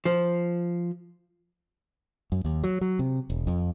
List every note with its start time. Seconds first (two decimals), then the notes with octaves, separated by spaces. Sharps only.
0.05 F3
2.32 F#2
2.45 D#2
2.64 F#3
2.81 F#3
2.99 C3
3.30 E1
3.47 F2